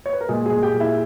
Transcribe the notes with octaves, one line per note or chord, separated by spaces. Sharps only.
C#5
B4
A#4
A#2 G#3 G#4
G#3 G#4
A#2
G4 G5
A#2
E4 E5